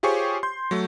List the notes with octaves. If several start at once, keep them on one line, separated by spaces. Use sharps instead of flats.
F4 G4 G#4 C5 C#5 C#6
C6 G6
F#3 A3